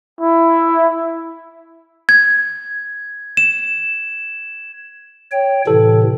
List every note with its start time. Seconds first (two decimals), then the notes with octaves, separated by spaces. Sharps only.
0.21 E4
2.09 G#6
3.37 E7
5.32 C#5 G5
5.67 A2 C3 E3 A4